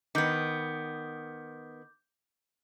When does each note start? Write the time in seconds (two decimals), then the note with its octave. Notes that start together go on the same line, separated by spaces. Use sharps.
0.15 D#3 B3 D6 G6